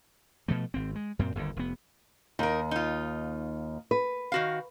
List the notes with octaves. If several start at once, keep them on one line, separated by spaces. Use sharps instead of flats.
B2 F3 A3
G#1 C4
G#3
F#2 A#2 C4
G1 D#2 A#2 D3
F1 B3
D#2 D#4 A#4
D#4 F4
B4
D#3 F#4 F5